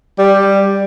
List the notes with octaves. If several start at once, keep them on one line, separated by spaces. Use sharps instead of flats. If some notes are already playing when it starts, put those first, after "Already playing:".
G3